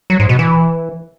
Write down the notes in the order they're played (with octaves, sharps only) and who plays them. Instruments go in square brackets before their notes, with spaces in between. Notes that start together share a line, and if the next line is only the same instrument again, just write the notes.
[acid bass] F#3
G#2
B2
E3